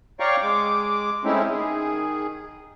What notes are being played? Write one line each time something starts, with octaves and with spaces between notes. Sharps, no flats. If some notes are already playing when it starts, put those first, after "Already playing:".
C#5 D5 F5 G5 A#5 C#6
G#3 D6
G#3 A3 C4 C#4 D#4 E4
D#3 G#4